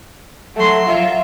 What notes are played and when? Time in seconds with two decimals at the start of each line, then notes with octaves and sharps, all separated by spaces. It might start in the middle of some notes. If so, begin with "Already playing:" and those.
0.56 F#3 A3 C6
0.87 F4 E5